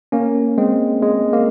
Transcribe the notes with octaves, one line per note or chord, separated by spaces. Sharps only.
A#3 C#4
G#3 C4
G#3
A#3